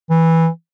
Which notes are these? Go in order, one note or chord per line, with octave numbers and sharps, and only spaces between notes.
E3